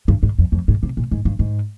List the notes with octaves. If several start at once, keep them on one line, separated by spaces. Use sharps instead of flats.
G2
G#2
F2
F2
G#2
C3
A#2
G#2
G2
G#2